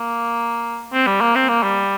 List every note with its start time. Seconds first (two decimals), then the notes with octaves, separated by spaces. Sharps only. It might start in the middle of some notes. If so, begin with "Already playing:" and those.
Already playing: A#3
0.93 C4
1.07 G3
1.21 A#3
1.35 C4
1.49 A#3
1.63 G3